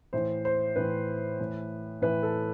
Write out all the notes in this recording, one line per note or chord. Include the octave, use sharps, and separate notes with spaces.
A2 E3 C5
C5
A2 E3 B4
A2 E3
A2 E3 B4
A4